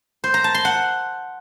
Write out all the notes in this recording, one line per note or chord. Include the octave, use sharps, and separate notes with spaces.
C5
A#5
A5
C6
F#5